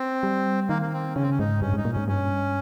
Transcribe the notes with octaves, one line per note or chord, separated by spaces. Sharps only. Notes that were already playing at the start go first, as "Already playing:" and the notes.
Already playing: C4
G3
D#3 A#3
A#3
C4
C#3 C#4
C4
C#4
G#2 D#4
G2 C#4
G#2 D#4
A#2
G#2 C#4
G2 C#4